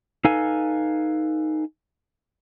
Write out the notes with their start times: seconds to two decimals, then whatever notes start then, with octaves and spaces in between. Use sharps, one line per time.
0.25 D#4 A4 B4 F5 G#5